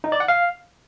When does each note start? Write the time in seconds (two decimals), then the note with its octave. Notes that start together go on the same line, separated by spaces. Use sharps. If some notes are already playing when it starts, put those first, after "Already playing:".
0.04 D#4
0.12 D5
0.20 F#5
0.28 F5